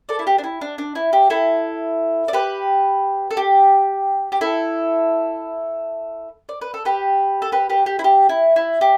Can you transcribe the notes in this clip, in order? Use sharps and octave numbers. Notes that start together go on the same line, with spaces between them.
A4 D5
E4
G4
D4
E4
D4
D4
E4
G4
E4 A4
D5
G4 B4
A4
G4
G4
E4 A4
D5
B4
A4
G4 B4
A4
G4 B4
G4 B4
G4
E4
G4
E4
E4
G4